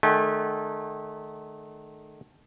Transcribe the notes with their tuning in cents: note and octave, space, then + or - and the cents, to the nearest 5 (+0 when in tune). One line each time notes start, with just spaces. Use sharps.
D#3 -40 A3 -30 G5 +45